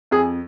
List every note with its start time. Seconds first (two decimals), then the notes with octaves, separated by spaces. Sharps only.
0.11 F2 G#4